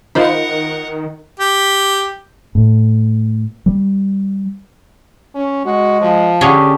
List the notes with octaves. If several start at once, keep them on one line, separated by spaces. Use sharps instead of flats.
D#3 D#4 F4 A#4 C5 F#5 B5
G4
A2
G3
C#4
G#3 F#4
F3
D3 C#4 G4 G#4